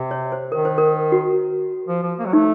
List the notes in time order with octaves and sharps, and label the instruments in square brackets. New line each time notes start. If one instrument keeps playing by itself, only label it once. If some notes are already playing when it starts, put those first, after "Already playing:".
Already playing: [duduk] C3
[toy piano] C#5
C5
[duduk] D#3 [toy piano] A#4
[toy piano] C5
A#4
F#4
[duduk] F3
F3
A#3
F#3
[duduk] A3 [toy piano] D#4